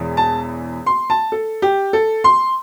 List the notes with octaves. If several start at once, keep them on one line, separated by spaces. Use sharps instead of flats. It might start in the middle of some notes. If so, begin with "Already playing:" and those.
Already playing: E1 E2 E3
A5
C6
A5
A4
G4
A4
C6